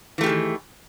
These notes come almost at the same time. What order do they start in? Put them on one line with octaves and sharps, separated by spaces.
E3 A3 G4 G#4 D#3